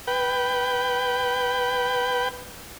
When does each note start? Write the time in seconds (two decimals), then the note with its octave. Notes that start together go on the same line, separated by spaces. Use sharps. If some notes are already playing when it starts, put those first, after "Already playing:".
0.07 B4 G5